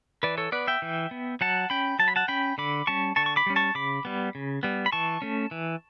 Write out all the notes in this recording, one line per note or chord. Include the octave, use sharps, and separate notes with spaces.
E3 B4 D5
A4 C#5
B3 B4 D5
E5 G5
E3
B3
F#3 F#5 A5
C#4 G5 B5
F#3 A5
B5
F#5 A5
C#4 G5 B5
D3 B5 D6
G3 C#4 A5 C#6
D3 A5 C#6
C#6
B5 D6
G3 C#4
A5 C#6
C#3 B5 D6
G3 B3
C#3
G3 B3
B5
E3 A5 C#6
A3 C#4
E3